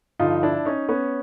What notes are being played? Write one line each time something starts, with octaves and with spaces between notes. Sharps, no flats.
G2 D3 F3 D#4 F4
D4 E4
C#4 D#4
B3 C#4